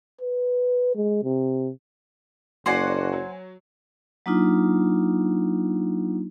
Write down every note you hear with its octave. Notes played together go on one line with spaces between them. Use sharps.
B4
G#3
C3
F#1 A#3 F#4 C5 D5 F#5 G#5
F#3
F#3 A#3 D4 D#4 F4